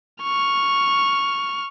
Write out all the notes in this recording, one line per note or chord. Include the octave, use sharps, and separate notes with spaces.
C#6 F6